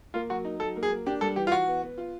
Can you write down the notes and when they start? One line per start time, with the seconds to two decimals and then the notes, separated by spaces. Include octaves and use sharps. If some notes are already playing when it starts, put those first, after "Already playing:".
0.14 A#3 F4
0.30 F#3 F#4
0.45 D#4
0.60 F#3 A4
0.76 A#3
0.83 G#4
0.90 A#3
1.06 D4 G4
1.21 G3 A4
1.36 E3 G4
1.47 F4
1.52 E3 F#4
1.67 B3
1.82 B3
1.98 F4